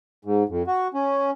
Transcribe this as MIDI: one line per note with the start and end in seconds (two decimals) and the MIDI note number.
0.25 0.43 44
0.49 0.63 41
0.67 0.88 66
0.94 1.30 61